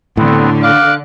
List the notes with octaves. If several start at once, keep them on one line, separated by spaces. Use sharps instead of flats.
A2 D3 B3 C4
F5 D6 F#6